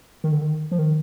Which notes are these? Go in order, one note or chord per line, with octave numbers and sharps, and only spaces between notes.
D#3
D3
D#3
F3
D#3